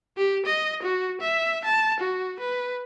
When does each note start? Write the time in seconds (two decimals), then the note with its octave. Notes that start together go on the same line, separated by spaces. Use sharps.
0.18 G4
0.46 D#5
0.83 F#4
1.21 E5
1.65 A5
2.00 F#4
2.40 B4